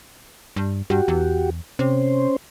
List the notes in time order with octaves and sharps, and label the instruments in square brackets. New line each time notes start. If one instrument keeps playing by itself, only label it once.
[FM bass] G2
[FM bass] G2 [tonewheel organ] F#4 G4
[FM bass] E2
[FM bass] C3 [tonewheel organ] C#4 C5